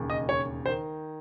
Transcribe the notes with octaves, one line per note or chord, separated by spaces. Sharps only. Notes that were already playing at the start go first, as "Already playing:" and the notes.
Already playing: E1 D#2 C#3
D#5
C#5
C5
D#3